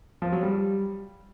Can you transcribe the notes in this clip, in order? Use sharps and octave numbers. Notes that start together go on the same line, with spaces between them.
F3
F#3
G3